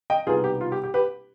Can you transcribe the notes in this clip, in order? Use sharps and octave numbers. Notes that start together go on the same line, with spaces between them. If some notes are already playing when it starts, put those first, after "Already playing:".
D#5 G5
C2 B2 G3 B3 D#4 F4 G#4
G4
F4
G4
G4
G4 B4